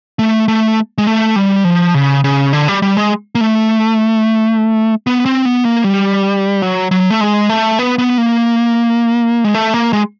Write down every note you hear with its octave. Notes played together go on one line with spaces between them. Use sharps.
A3
A3
G#3
A3
G3
F3
C#3
C#3
D3
G3
G3
G#3
A#3
A3
B3
C4
B3
A#3
G3
F#3
F#3
A3
G#3
A3
B3
B3
A#3
G#3
A3
A#3
G#3